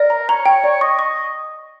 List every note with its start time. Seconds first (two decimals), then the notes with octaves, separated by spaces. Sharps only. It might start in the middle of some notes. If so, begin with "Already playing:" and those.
Already playing: A#4 D5
0.10 A#5
0.29 C#5 A#5
0.46 G5
0.64 D5
0.81 D#5 C#6
0.99 C#6